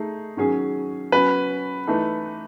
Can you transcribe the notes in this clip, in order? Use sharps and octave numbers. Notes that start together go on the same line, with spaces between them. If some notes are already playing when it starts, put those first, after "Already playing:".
Already playing: A3 D#4 G#4
D#3 F#3 C#4 G#4
F#3 C#4 F#4 B4
E3 A3 D#4 A4